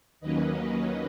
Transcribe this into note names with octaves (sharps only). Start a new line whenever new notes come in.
D#2 D#3 F#3 A#3 C#4 B4 D#5